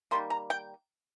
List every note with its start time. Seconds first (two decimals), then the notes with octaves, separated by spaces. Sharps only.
0.11 D#3 G3 A#3 C6
0.30 A#5
0.50 G5